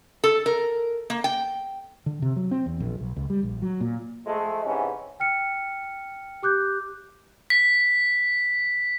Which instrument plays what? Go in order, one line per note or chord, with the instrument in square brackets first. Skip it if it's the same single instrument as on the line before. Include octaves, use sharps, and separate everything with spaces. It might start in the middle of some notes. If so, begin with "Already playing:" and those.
[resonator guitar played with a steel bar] A4
A#4
A#3
G5
[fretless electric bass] D3
C3
F#3
C4
E2
A#1
B1
C#2
G3
A#1
F#3
A#2
[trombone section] F3 G#3 A3
G#2 C3 E3 C#4
[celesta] G5 F6 C#7
G4 D6 F#6 G6
[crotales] B6